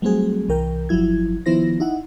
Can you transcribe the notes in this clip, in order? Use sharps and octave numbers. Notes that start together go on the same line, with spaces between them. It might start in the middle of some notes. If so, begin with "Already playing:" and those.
F#3 G3 A3 C4 F#4 G#4
C2 E3 A#4 G5
G1 F3 F#3 E4 G#6
D#3 F3 B3 E4 C5 A#6
D#4 E4 F#5